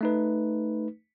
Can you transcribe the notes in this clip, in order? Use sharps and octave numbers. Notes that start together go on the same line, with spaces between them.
A3 D#4 B4